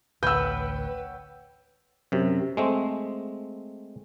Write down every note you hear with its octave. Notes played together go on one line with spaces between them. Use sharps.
A1 D2 B4 C#5 F#5 G5 E6 G6
F#2 C3
G#3 A3 C4